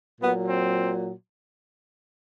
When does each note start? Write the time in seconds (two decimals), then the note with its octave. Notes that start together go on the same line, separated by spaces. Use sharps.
0.21 A#2 F#3 B3
0.49 C4